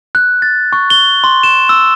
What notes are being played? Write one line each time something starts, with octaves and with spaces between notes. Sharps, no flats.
F#6
A6
C#6
G7
C6
E7
E6